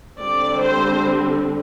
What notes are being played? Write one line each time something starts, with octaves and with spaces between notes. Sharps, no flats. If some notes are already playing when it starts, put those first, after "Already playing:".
D3 G3 C4 D5
C5